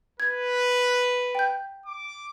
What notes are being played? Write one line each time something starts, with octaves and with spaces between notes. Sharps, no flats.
B4 G#6
G5 G6
D6